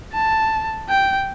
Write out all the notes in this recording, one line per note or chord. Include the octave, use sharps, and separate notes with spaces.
A5
G5